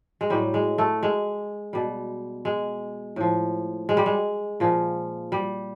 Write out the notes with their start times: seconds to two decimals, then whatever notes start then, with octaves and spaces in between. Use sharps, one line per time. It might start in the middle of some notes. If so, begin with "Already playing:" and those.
0.21 G#3
0.30 A2 F#3 G3
0.54 G#3
0.78 A3
1.03 G#3
1.73 B2 G3
2.45 G#3
3.16 A2 F3
3.89 G#3
3.97 G3
4.06 G#3
4.60 A#2 F3
5.32 G3